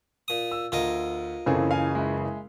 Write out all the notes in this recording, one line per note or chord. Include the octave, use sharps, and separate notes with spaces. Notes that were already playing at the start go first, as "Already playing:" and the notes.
A#2 D#6
E6
D2 F4 A#4 D#5
F#1 C#3 E3 C4 G#4 A4
F5 G#5
G#3 E4